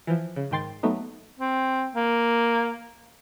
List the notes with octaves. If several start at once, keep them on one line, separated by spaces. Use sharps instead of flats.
E3 F3
C#3
G#2 D#3 G5 C6 A6
F#3 A3 B3 D#4
C4
A#3